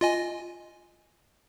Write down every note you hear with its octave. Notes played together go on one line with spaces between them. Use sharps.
F4 D#5 G#5